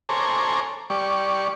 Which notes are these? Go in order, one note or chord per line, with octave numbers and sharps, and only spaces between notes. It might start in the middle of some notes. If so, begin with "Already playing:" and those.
A4 C5 C#5 G#5 A#5 D6
G3 D5 C#6